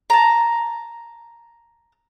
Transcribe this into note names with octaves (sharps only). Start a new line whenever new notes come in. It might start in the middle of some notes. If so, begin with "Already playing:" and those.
A5 A#5